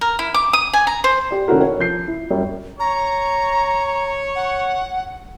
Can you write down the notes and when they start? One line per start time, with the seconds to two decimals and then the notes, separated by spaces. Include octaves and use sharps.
0.01 A#4
0.19 E4
0.34 D6
0.53 D#6
0.73 G#5
0.87 A#5
1.04 C5
1.31 G4 D5
1.48 D#3 A3 C#4 E4 F#4 A#4
1.61 C#5
1.80 F3 G6 C7
2.08 E4
2.30 F#2 G3
2.80 C#5 A#5
4.35 F#5